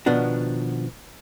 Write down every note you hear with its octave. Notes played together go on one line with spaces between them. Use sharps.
B2 D#3 F3 B3 D4 F#4